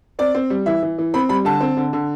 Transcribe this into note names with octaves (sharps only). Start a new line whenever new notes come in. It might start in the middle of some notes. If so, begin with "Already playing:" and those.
C4 D5
C4
G3
E3 E5
E3
E3
C4 B5
G3 B5
D3 A5
C4
D3
D3